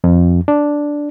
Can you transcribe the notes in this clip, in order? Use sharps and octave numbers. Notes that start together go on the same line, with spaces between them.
F2
D4